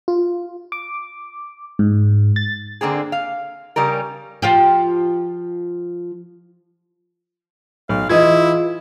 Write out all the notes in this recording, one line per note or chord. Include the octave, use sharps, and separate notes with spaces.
F4
D6
G#2
A6
D3 A#3 C4 G#4
F5
C#3 G3 C#4 A#4
F3 F4 G4
B1 F5
E3 E4 F4 G#4 B4 D#5 D#6 G#6